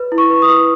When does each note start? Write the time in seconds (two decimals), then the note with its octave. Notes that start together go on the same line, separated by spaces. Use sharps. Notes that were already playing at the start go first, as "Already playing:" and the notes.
Already playing: B4
0.12 E4
0.18 C#6
0.30 B4
0.42 D#6
0.48 B4